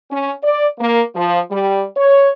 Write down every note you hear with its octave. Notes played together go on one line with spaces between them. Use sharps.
C#4
D5
A#3
F3
G3
C#5